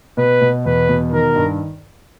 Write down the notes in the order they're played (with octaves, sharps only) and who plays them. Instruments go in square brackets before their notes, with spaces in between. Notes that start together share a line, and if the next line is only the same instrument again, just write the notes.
[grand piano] B2 [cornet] B4
[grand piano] B2
[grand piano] E2 [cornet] B4
[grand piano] B2
[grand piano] D#3 [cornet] A#4
[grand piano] G2